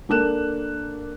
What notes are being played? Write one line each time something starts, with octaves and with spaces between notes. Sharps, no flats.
A#3 D4 A4 F#6 E7